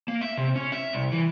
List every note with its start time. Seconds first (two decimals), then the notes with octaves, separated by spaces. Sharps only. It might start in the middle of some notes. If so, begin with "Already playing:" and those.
0.08 A#3
0.21 E5
0.37 C3
0.56 C#4
0.72 E5
0.93 C2
1.12 E3